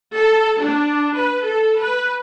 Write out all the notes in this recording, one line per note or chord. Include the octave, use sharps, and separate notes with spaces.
A4
D4
B4
A4
B4